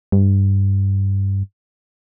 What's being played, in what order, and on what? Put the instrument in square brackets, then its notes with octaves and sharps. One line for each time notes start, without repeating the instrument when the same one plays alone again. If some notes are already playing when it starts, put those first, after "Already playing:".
[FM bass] G2